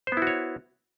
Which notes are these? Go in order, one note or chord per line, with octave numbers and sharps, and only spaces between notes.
B3 E4 F#4 C5 C#5